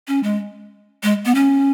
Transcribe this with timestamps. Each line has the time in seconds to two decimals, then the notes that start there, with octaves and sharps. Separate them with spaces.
0.08 C#4
0.23 G#3
1.03 G#3
1.25 B3
1.35 C#4